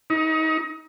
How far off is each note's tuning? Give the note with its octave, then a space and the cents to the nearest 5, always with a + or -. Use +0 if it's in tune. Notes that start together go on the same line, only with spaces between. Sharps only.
D#4 +30